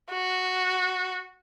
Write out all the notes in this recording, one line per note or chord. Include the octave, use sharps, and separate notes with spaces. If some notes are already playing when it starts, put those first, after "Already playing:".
F#4